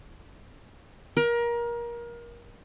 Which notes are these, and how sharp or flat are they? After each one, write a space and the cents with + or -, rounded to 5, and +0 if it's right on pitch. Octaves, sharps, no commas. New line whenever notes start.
A#4 +25